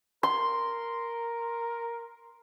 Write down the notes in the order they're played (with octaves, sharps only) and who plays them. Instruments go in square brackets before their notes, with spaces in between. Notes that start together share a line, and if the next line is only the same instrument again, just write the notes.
[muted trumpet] A#4 [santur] C6